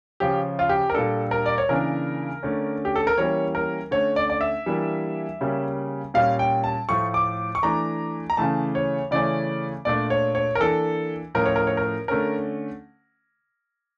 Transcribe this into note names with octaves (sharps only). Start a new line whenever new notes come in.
C#3 F3 C#4 G4
F4
G4
A#4
A#2 G3 D4 A4
A#4
D5
C#5
C#3 E3 A#3 D4 A#4
D3 A3 C#4
G4
A4
A#4
E3 G3 A#3 C#4 C#5
A#4
D3 A3 C#4 C#5
D5
D5
E5
E3 G3 A#3 D4
C#3 G3 A#3 C#4
A#2 G3 C#4 F5
G5
A5
A2 F3 A3 C#6
D6
C#6
E3 A3 D4 A#5
A#5
C#3 E3 A3 A5
C#5
C#3 E3 A3 C#4 D5
A#2 A3 D4 D5
C#5
C#5
A#4
E3 A#3 D4 A4
A2 F3 C#4 A#4
C#5
A#4
C#5
A#4
D3 A3 C#4 A#4